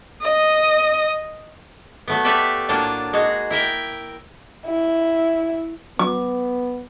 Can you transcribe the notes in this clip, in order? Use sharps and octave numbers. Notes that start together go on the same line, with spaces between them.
D#5
F#3 A3 B3
G4 A4 B4 D5 E5 F5
A2 F#3 A#3 D4 F4 A5
G#3 D#4 F#4 G#4
E4 A#4 E5 G5
E4
B3 D6